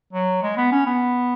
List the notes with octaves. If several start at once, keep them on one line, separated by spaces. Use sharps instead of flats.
F#3
G#3
B3
C#4
B3